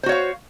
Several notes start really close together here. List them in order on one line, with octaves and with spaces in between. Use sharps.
C5 F#4 C#5 F5